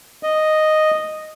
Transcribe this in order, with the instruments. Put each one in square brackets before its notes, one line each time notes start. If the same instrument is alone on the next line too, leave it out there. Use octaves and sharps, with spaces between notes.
[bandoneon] D#5